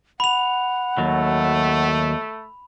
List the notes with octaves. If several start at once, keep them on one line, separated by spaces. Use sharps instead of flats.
F#5 B5 F7
D#2 F#3 A3